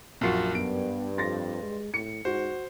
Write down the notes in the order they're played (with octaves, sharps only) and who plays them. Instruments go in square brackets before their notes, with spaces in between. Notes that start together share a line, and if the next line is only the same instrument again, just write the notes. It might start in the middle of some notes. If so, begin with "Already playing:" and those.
[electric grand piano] A#1 F4 F#4 [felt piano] F#2 C7
[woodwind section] G2 [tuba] B3 [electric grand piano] D7
[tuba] F2 [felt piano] C6 A6 A#6
[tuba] G#3
[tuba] A2 [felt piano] C#7
[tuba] G#2 [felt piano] F#4 [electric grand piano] C5